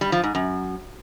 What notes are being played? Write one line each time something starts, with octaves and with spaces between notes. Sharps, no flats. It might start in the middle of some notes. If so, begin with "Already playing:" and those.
G3
F3
G#2
F#2